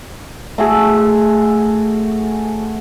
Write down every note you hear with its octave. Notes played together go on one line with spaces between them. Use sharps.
A3 F#4 G#4 A4